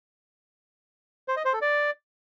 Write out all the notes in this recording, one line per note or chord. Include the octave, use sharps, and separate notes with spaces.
C5
D#5
C5
A4
D5